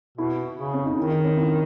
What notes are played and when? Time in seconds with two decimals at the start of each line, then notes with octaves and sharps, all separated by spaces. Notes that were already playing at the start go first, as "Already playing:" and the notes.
0.18 B2 E4
0.58 C#3
0.73 C#4
0.86 D#4
0.97 D#3 E4
1.11 D#4
1.24 C#4
1.37 E4